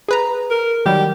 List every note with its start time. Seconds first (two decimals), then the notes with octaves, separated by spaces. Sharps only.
0.09 G#4 B4 A#5
0.50 A#4
0.86 D#3 F#3 G3 G4